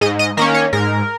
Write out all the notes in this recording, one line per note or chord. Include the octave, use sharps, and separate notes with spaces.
G#2 D#5
D#5
D#3 A#3 C#4 A#4
C#5
G#2 A#4